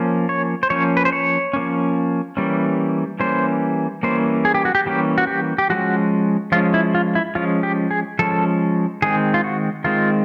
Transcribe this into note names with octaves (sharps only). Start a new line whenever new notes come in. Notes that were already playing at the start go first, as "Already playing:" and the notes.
Already playing: F3 A#3 C#4
C#5
C5
F3 A#3 C#4 C#5
B4
C5
C#5
F3 A#3 C#4
E3 G3 A#3 C#4
E3 G3 A#3 C#4 C5
E3 G3 A#3 C#4 C5
G#4
G4
F#4
G4
E3 G3 A#3 C#4 G4
F#4
G4
G4
F3 G#3 C#4 F#4
F3 G#3 C#4 F4
E4
F4
E4
F3 G#3 C#4 F4
G4
G#4
F3 G#3 C#4 A4
D#3 G#3 C4 G#4
F4
F#4
D#3 G#3 C4 F4